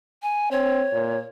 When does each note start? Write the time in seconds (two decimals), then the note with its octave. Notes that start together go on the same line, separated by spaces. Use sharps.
0.23 G#5
0.51 C4 C#5
0.93 A#2